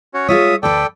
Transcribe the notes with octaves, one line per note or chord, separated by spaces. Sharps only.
C#4 F#4 C#5
G#3 F4 C#5 E5 D#6
D2 A4 B4 D5 G5